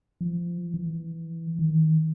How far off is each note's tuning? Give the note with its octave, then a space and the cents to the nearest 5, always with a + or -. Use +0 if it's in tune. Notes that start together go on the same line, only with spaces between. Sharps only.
F3 -25
E3 +0
D#3 +25